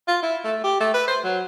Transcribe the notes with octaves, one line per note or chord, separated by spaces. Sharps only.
F4
E4
A3
G4
A3
B4
C5
F#3